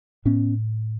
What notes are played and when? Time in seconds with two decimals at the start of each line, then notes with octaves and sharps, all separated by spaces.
0.25 A2 B3 C#4